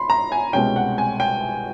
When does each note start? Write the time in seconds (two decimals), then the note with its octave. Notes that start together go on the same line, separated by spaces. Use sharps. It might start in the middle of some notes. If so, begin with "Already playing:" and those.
Already playing: B5 C6
0.10 A#5
0.32 G#5
0.53 C2 B2 G#3 C#4 G5
0.76 F#5
0.98 G#5
1.20 G5